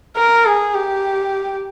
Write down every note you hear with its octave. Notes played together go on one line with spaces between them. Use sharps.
A#4
G#4
G4